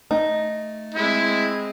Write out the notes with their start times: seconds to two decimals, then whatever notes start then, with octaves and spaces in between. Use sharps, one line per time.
0.11 A3 D#4
0.95 G#3 C4 E4